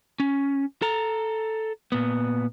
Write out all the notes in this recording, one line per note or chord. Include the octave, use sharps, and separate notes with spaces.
C#4
A4 A#5
A#2 B3